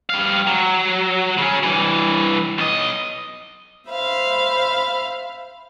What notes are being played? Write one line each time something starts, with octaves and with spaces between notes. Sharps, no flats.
G3 F5
F#3
C#3 C#4
G2 E3
B1 D#5
C5 E5 F5 B5